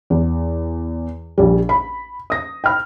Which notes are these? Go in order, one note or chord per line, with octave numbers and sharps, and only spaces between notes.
E2
A#1 G3
B5
D#6 A#6
G5 B5 F6